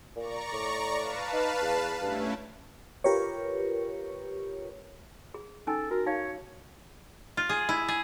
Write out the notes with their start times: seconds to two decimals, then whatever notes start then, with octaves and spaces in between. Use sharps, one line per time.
0.16 A#2 D5 A#5 C#6
0.52 A2
0.99 B4 F5 A5
1.33 D#4
1.62 E2
2.01 G2 A3 C#4 E4
3.04 F4 G4 A#4 B4 C#5
5.34 G#4
5.67 C#4 D#4 A4 G#5
5.91 F#4 A#4
6.06 D#4 C#5 F5
7.37 F4
7.49 G#4
7.69 E4
7.89 G#4